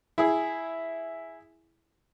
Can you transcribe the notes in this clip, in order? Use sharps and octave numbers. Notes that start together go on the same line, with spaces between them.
E4 G#4